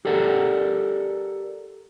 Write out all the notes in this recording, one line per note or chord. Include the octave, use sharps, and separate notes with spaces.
G4 A4 A#4 D5 F#5